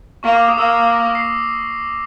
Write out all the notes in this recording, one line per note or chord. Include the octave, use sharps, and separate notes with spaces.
A#3 C#6
D6
D#6
A#3 E6
A#6
C7